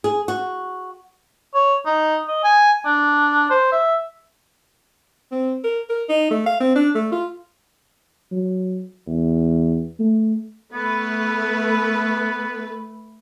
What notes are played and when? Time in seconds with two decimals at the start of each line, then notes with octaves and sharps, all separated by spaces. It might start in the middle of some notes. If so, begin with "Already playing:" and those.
0.04 G#4
0.28 F#4
1.54 C#5
1.86 D#4
2.28 D#5
2.44 G#5
2.86 D4
3.50 C5
3.72 E5
5.32 C4
5.64 A#4
5.89 A#4
6.09 D#4
6.31 A3
6.46 F5
6.60 C4
6.75 D4
6.95 A3
7.12 F4
8.32 F#3
9.07 E2
10.00 A3
10.73 A3 B3 B4